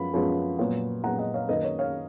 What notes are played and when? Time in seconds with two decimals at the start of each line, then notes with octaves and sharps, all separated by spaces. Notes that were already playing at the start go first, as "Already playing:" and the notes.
Already playing: F#2 F3 G#3 B3 B5
0.14 F#2 F3 G#3 B3
0.59 A#2 F#3 B3
1.04 A#2 F#3 B3 F#5 A#5
1.19 D#5 F#5
1.34 C#5 F5
1.49 F#2 D#3 A#3 B4 D#5
1.64 C#5
1.79 C#5 F5